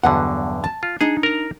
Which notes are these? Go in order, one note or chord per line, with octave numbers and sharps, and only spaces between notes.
B1 E2 G2 B2 D3 F#5
A5
F4
D4 D#4 G#4
A#4 A#5